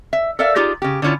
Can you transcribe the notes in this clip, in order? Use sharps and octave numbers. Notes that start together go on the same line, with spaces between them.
E5
A4 A#4 D5 E5 F5
D#4 F4 G4 G#4 D5
C#3 G4
D3 F#3 C#4 E4 F4